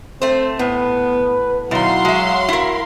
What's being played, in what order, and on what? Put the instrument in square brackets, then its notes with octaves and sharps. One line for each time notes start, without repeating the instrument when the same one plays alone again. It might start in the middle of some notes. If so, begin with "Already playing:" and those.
[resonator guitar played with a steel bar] A3 C5 [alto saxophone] C4
[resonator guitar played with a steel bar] A2 [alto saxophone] B3 [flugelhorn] B4
[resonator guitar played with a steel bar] B2 D#3 [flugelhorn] F#3 [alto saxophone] E4 [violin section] F5 F#5 C6
[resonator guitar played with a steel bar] G#3 E5 [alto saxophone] F#4
[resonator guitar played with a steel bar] E4 A#4